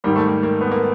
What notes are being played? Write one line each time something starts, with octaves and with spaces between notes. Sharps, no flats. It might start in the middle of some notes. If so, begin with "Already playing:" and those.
G#2 D#3 G3 A#3
A3
A#3
A#3
B3
A#3